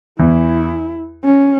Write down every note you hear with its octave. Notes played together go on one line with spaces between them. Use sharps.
E2 E3 E4
C#4